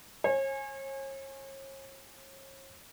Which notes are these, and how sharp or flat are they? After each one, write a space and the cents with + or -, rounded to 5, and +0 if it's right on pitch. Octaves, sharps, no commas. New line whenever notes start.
C#5 -40 G#5 +0